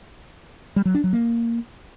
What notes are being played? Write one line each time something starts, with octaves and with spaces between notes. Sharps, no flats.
G3
F#3
D4
F#3
A#3